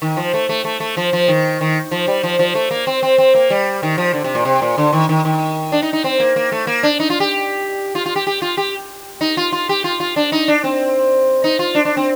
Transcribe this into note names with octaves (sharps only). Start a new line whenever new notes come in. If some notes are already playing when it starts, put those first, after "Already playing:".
D#3
F3
A3
A3
A3
A3
F3
F3
D#3
D#3
F3
G3
F3
F3
A3
A#3
C4
C4
C4
A#3
G3
D#3
F3
D3
C3
A#2
C3
A#2
D3
D#3
D#3
D#3
D4
D#4
D#4
C4
A#3
A#3
A3
A#3
D4
D#4
F4
G4
F4
F4
G4
G4
F4
G4
D#4
F4
F4
G4
F4
F4
D4
D#4
D4
C4
D#4
F4
D4
D4
C4